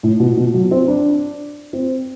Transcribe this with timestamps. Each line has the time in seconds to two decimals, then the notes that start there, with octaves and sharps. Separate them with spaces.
0.03 A2
0.20 B2
0.37 B2
0.54 F#3
0.71 C4
0.88 D4
1.73 C4